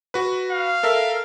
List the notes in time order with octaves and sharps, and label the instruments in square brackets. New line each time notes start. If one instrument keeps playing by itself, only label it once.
[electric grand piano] F#4 B4
[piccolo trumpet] F5
[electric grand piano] A4 A#4 E5